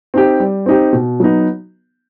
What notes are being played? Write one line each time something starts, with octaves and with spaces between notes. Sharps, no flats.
C4 D#4 G4
G3
C4 D#4 G4
B2
F#3 B3 D#4